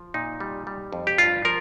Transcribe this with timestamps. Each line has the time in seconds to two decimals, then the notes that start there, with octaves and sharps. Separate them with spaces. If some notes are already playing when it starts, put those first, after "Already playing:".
Already playing: F3
0.14 A#2 D#4
0.40 G3
0.67 G3
0.93 F2
1.07 G4
1.18 G2 F4
1.45 F3 A#4